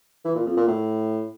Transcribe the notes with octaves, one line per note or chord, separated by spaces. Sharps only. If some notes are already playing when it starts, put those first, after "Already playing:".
E3
A#2
F2
A#2
A2